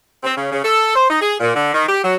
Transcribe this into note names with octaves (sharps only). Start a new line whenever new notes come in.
C4
C#3
C#3
A4
C5
D#4
G#4
A#2
D3
D#3
G4
F#3